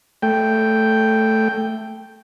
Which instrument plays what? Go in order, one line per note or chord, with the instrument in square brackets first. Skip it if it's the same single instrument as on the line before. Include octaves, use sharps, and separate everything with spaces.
[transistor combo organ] A3 G5